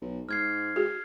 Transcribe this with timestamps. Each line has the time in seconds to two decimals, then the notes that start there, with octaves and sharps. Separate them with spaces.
0.01 B1
0.29 G#2 F6 G#6 C7
0.76 F#4 G#4